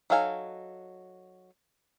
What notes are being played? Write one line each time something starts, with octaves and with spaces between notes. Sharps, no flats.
F#3 D#4 A4 F5 G#5